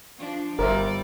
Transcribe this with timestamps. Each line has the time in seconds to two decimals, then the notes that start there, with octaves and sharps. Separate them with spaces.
0.19 F3 D4
0.59 G1 G3 A#4 C5 D5 E5